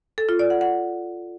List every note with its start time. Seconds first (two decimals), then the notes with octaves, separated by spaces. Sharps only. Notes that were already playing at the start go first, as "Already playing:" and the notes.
0.18 A4
0.29 F4
0.39 D5
0.50 F#5
0.61 F#5